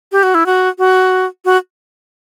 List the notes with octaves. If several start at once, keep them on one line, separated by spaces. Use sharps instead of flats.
G4
F#4
E4
F#4
F#4
F#4